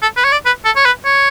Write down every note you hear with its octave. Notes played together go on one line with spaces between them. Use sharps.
A4
B4
C#5
D5
B4
A4
C#5
B4
C#5